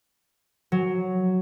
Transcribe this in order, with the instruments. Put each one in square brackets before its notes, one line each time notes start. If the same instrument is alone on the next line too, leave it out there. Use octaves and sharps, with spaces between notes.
[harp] F#3